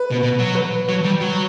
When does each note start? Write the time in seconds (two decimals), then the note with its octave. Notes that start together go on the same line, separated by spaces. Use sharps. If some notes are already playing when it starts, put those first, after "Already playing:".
Already playing: B4
0.11 B2
0.23 B2
0.39 F#3
0.55 B4
0.89 F#3
1.04 G3
1.21 F#3